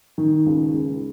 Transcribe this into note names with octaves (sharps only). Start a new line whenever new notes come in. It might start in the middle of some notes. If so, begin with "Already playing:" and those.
D#3
C#2
C#2